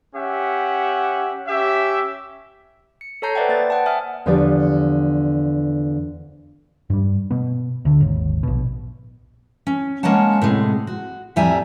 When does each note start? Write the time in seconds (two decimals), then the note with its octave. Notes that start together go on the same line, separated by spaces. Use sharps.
0.16 C#4 G4 E5 F#5
1.47 C#4 G4 E5
3.01 C#7
3.22 A4 C#5 A5 A#5 G6 C7
3.35 B4 C5 D5 E5 F#5 G5
3.49 A#3 B4 A6
3.70 F#5 G5 A5
3.86 E5 F#5 G#5 D#6 F6
4.26 E2 D3 F3 G4 B4 D5
6.90 G2 G3
7.31 B2 B3
7.85 D2 D3
8.01 G#1 D#2
8.43 A#1 B2
9.67 C#4
10.03 G#3 A#3 C#4 C#5 F#5 A5
10.42 A2 C3 G#3
10.87 F#4
11.36 F2 A2 G3 E5 G#5 A#5